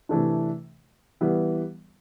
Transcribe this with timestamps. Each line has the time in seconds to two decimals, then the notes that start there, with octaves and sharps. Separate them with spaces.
0.09 C3 E3 A3 D4
1.21 E3 G3 B3